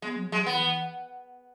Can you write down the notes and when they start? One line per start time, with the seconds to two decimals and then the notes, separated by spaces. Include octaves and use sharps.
0.02 G#3 B3
0.17 F#3
0.28 E3
0.32 F#3 G#3
0.46 E3 B3
0.61 E3